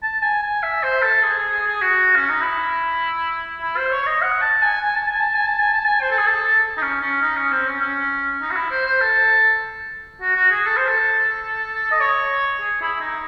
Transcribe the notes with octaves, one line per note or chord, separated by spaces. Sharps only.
A5
G#5
G#5
E5
C5
A4
G#4
G#4
G#4
G#4
F#4
C#4
D#4
E4
E4
C5
C#5
C#5
D#5
F#5
A5
G#5
G#5
A5
G#5
A5
G#5
A5
G#5
A5
G#5
C5
A4
G#4
A4
D#4
C#4
C#4
D#4
C#4
C4
C#4
C#4
D#4
F#4
E4
C5
C5
A4
F#4
F#4
G#4
A4
C5
A4
D#5
C#5
G#4
E4
D#4